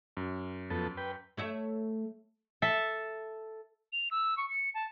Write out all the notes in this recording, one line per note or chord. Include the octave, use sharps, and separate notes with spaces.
F#2
F2 B3 A4
B4 G5
A3 C#5 E5
A4 E5
F7
E6
C#6
C#7
A5